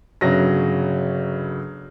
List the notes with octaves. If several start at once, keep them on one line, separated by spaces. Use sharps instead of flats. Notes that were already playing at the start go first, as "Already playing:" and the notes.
G1 C#3 F#3 A#6